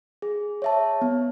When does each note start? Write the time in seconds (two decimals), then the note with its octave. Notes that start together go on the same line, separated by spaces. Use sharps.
0.22 G#4
0.62 C#5 E5 A5
1.01 B3